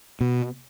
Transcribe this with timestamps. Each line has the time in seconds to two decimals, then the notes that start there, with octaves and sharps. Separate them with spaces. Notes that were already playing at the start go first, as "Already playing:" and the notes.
0.21 B2